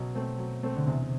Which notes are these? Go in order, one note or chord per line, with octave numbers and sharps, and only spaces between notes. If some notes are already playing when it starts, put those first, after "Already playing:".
Already playing: B2 F#3
A3 C4
F#3
A3 C4
D3
E2 C3